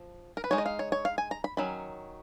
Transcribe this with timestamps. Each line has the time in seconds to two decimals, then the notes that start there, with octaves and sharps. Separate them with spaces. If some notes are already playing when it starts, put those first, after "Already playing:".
Already playing: F3
0.37 A#4
0.44 B4
0.51 G#3 D#4 C#5
0.58 D#5
0.66 F5
0.79 C#5
0.92 C#5
1.05 F5
1.18 G#5
1.31 A#5
1.44 B5
1.57 D#3 F#3 C#4 B5